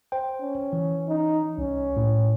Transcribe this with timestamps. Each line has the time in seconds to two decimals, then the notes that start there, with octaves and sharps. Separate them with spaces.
0.12 C5 G5
0.42 C#4
0.73 E3
1.08 D#4
1.58 C2 C#4
1.97 A2